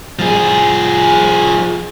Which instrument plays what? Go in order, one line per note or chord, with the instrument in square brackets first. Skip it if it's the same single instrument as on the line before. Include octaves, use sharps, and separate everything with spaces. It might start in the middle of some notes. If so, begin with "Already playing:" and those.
[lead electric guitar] F3 G#4